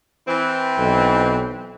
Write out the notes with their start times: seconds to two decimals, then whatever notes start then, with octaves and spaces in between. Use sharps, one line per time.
0.27 E3 C4
0.79 B1